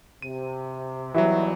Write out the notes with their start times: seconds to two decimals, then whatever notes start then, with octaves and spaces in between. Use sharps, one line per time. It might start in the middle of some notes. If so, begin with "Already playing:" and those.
0.22 C3 D#7
1.14 E2 G#2 E3 F#3 G3 E4 F#4 E5